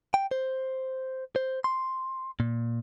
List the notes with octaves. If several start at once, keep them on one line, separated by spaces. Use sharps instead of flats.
G5
C5
C5
C6
A#2